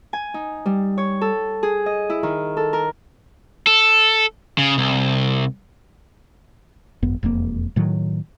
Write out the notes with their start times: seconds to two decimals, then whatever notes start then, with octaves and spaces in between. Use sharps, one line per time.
0.13 G#5
0.34 D#4
0.66 G3
0.98 C#5
1.21 A4
1.63 G#4
1.86 D#5
2.10 E4
2.23 D#3
2.57 A4
2.73 A#4
3.67 A4
4.58 C#3
4.78 C2
7.03 G#1 F#2 B3
7.23 E1 F2 F3 A#3
7.76 A2 D#3 F#3